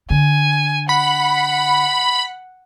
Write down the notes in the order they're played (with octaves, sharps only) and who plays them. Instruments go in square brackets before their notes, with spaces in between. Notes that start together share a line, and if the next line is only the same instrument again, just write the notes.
[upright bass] D3 [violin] G#5
[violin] F#5 [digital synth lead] B5